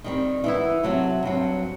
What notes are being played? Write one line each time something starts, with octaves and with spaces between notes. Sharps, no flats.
D#3 G3 C4
E3 B3 E4
C3 F#3 A3
G2 F#3 C4